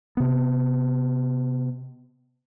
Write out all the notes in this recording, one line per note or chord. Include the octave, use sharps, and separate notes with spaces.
C3 B3